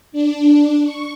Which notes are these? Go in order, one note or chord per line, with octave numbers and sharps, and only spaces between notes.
D4
C#6